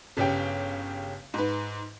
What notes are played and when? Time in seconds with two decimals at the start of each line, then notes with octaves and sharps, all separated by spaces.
0.17 G1 C#3 C#4 G4 G5
1.34 G#2 B4